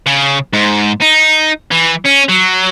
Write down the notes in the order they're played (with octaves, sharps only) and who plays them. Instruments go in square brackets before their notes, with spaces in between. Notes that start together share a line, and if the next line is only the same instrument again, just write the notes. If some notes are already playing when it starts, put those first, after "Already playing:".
[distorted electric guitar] C#3
G#2
D#4
E3
C#4
F#3